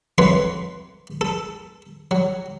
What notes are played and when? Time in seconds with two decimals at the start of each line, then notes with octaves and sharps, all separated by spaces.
0.18 F2 E3 F#3 B4 C6
1.21 A4
2.11 F#3